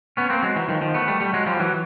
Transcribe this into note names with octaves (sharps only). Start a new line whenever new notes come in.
B3 C#4
A#3 C4
F#3 G#3
E3 F#3
D#3 F3
D#3 F3
A3 B3
G3 A3
G3 A3
F#3 G#3
F3 G3
E3 F#3